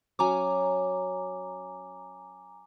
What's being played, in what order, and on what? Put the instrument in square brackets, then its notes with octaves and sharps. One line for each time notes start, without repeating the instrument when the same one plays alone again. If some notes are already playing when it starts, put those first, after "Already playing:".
[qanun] F#3 C#4 [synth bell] G#5 A#5 D6